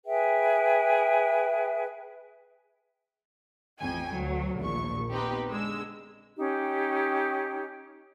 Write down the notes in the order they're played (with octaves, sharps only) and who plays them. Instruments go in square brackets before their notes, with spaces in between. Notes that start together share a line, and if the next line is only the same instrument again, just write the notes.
[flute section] G#4 B4 E5 G5
[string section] A1 F2 G5 G#5
D2 F#3
A#1 D#2 A#2 C#6
B3 C4 D#4 G4 B4
D3 G#3 E6
[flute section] C#4 D#4 G4